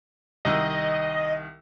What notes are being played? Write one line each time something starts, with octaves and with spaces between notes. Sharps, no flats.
C2 D#3 D#5 E6